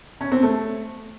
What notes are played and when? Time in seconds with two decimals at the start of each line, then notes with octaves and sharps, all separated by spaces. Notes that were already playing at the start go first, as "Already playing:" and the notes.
0.21 C#4
0.32 C4
0.43 A3